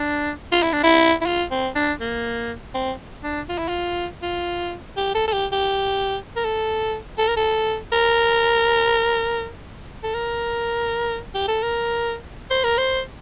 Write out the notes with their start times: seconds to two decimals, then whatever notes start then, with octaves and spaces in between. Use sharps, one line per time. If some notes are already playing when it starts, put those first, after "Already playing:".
Already playing: D4
0.52 F4
0.62 E4
0.72 D4
0.83 E4
1.21 E4
1.26 F4
1.51 C4
1.75 D4
2.00 A#3
2.74 C4
3.23 D4
3.49 F4
3.58 E4
3.68 F4
4.22 F4
4.97 G4
5.15 A4
5.28 A4
5.33 G4
5.52 G4
6.36 A#4
6.44 A4
7.18 A4
7.28 A#4
7.36 A4
7.92 A#4
10.03 A4
10.14 A#4
11.35 G4
11.48 A4
11.63 A#4
12.50 C5
12.64 A#4
12.78 C5